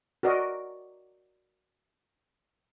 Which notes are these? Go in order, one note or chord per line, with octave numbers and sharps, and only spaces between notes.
F#4 A#4 D5 D#5